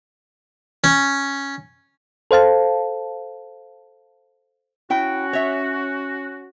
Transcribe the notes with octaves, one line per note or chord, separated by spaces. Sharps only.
C#4
A4 C5 F5 A5
C#4 E4 F#4 G5
C#5 E5